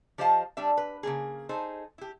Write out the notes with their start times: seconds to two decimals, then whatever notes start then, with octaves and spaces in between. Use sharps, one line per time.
0.18 F3 G4 C5 D#5 F5 A5
0.57 G3 D4 E5
0.77 B4
1.03 C#3 A#3 G#4
1.49 D#4 G#4 A4 C5
1.98 E4 G4